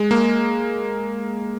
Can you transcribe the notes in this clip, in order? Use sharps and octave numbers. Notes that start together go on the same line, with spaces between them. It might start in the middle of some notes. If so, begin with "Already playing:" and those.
Already playing: G#3
A#3